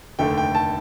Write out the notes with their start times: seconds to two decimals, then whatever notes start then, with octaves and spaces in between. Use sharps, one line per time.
0.19 F1 D#2 D3 A3 G5
0.38 G5
0.55 A5